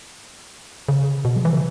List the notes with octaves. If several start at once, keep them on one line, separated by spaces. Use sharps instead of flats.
C#3
B2
F#3
E3
C#3